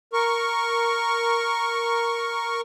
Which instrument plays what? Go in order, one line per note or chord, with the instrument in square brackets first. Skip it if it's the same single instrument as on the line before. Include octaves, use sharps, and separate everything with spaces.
[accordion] A#4 C#6